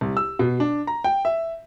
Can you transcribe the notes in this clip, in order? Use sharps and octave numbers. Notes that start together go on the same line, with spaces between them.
C2
E6
B2
D4
A#5
G5
E5